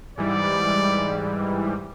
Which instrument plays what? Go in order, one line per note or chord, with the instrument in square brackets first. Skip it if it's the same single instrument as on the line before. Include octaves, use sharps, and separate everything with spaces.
[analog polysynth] G#2 E3 G3 [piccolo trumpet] D5